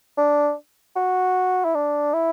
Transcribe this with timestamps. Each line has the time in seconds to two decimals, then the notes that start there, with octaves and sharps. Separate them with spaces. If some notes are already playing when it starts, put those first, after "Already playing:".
0.18 D4
0.96 F#4
1.65 E4
1.75 D4
2.14 E4